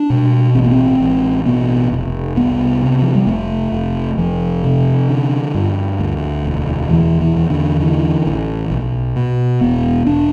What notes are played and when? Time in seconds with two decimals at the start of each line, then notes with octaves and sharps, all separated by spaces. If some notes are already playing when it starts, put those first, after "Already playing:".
Already playing: D4
0.10 B2
0.55 A1 C4
0.64 B3
0.71 C4
1.00 A1
1.45 B2 B3
1.92 F1
2.36 C2 B3
2.82 C3
3.02 F3
3.15 G3
3.27 F1 A3
3.72 F1
4.17 F1 F3
4.64 C3
5.09 D3
5.54 G2
5.99 D2
6.45 E1
6.90 E2 E3
7.21 E3
7.36 E2
7.50 D3
7.80 D3 E3
8.26 A1
8.71 B1
9.16 B2
9.61 E1 B3
10.07 E1 D4